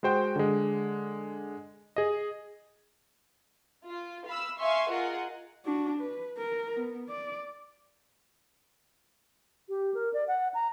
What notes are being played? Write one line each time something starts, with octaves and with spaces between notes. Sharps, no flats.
G#3 F#4 C5 G5
D3 G#3
G#4 D#5
F4
F5 B5 E6
E5 F5 G#5 C6 C#6
F4 G#4 A#4 D#5 F#5
D4 F#4
B4
A#4
B3
D5
G4
A#4
D5
F#5
A#5